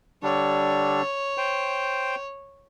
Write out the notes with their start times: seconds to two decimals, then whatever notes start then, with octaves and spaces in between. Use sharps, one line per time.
0.23 D3 G3 D4 C#5
1.38 C5 G5